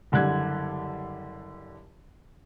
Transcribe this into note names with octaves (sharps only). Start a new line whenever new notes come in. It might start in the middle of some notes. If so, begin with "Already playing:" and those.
F#1 D3 G3 F#6 G#6